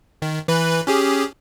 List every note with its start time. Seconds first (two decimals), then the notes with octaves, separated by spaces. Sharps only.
0.22 D#3
0.48 E3 B4 B5
0.87 C#4 G4 G#4